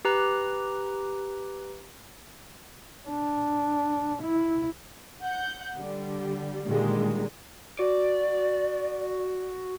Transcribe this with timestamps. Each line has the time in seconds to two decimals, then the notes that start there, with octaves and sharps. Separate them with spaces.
0.05 G4 B4 A#5 F#6
3.08 D4
4.23 E4
5.23 F#5 G6
5.77 D3 G3
6.66 A#2 D3 D#3 G3 G#3
7.79 F#4 D5